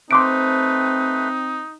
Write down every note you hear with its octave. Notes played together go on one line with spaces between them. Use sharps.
A3 C4 D#4 B4 C6 D6 D7